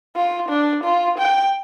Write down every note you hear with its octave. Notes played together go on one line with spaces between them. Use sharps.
F4
D4
F4
G5